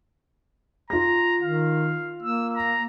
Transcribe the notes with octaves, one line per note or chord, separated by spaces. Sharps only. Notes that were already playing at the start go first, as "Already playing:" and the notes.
F4 A#5 A#6
D#3 F5
A#3 E6
A#5